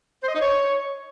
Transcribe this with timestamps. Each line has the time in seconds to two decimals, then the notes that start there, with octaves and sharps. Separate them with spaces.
0.22 C5
0.28 D#5
0.35 D#4
0.41 C#5